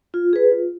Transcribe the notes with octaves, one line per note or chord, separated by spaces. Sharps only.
F4
G#4 B4
F4